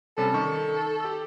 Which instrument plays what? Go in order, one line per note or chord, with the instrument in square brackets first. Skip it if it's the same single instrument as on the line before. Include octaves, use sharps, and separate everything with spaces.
[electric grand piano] C3 G3 C#4 [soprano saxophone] A4
[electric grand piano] D#3 C#6
G4 E6